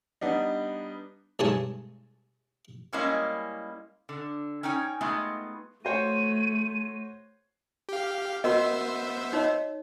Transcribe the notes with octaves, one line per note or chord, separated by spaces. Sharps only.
G3 B3 D4 D#4
B1 G2 G#3 C#5 G#5 A5
G3 G#3 A#3 C#4 E4 D#5
D3
C#4 D#4 C#5 G5 G#5
G#3 A3 B3 D#4 F4
A3 F#4 C5 C#5 D#7
G4 F5
B3 F#4 A#4 C5 D#5 E5
D#4 C#5 D#5